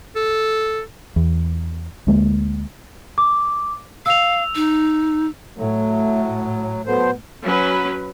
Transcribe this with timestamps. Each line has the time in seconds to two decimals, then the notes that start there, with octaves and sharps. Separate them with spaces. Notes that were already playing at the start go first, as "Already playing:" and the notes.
0.16 A4
1.16 E2
2.07 D2 G#3 A#3
3.18 D6
4.06 F5 E6 F7
4.55 D#4
5.58 A2 F#3 A3
6.86 F#3 B3 A4 C5
7.44 F#3 C#4 B4